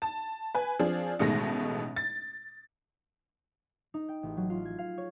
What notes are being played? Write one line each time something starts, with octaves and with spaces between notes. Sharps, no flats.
A5
B4 G#5
F3 C4 D4 G#4
A1 B2 D#3 G#3 A3 A#6
A6
D#4
G5
A1
F#3
F4
G#6
F5
C#5